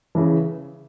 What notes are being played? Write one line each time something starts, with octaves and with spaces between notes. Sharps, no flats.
C#3 E3